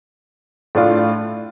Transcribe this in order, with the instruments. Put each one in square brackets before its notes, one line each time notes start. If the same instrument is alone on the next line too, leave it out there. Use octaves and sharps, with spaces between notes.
[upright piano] A2 A3 D4 F4